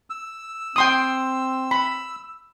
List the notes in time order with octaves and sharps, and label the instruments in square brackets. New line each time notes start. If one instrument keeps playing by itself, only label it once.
[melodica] E6
[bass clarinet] C4 [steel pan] G5 C6 D#6
[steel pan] B5